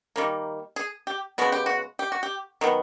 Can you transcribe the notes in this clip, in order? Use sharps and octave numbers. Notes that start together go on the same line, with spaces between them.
D#3 G3 A#3
G#4
G4
C#3 F3 G#3 B3 F#4
G4
F#4
G4
F#4
G4
D#3 F#3 B3